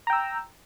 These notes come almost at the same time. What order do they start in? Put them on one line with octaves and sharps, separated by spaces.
A#5 G5 E6